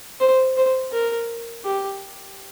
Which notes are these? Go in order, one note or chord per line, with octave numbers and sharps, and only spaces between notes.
C5
C5
A#4
G4